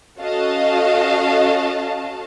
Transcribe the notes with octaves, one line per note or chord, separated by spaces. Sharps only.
C#4 F#4 A4 D#5 F5 A5